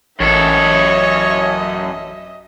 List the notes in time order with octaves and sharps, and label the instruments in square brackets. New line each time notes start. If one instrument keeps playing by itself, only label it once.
[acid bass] A1 [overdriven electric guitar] F#2 A4 [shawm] C#5 [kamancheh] D#5 E5